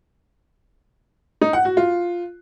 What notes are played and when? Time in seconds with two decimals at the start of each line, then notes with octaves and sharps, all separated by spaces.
1.41 D#4
1.53 F#5
1.65 F#4
1.77 F4